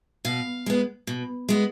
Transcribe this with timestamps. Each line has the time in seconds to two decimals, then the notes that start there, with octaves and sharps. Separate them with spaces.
0.25 B2 F5
0.66 G#3 B3
1.07 B2
1.49 G#3 B3